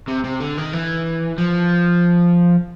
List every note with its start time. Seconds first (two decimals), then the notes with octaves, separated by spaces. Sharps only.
0.08 C3
0.24 C3
0.41 D3
0.58 D#3
0.73 E3
1.38 F3